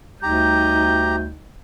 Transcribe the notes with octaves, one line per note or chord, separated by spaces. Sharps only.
D2 G3 D#4 G4 A#5 G6